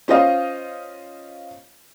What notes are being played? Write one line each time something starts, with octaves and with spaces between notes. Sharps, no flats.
C#4 F4 C5 D#5 F5